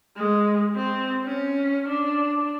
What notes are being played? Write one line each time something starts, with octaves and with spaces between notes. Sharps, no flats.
G#3
C4
C#4
D4